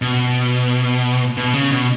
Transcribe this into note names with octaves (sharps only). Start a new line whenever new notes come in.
B2
B2
C#3
B2